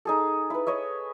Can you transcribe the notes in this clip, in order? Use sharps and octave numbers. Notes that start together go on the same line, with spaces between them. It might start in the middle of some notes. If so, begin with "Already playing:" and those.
D#4 G#4 A4
E4 B4
C#5 D#5 E5